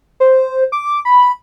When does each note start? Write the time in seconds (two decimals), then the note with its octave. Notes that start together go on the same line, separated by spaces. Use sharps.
0.20 C5
0.72 D6
1.05 B5